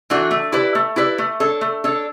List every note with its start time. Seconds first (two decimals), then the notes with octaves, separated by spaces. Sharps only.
0.10 E3 A3 D4 F#4
0.31 A3
0.52 E4 G4 B4 D5
0.75 A3
0.96 E4 G4 B4 D5
1.18 A3
1.40 D4 A4 C#5
1.61 A3
1.84 D4 A4 C#5